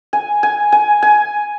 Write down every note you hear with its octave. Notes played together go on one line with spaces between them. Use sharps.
G#5
G#5
G#5
G#5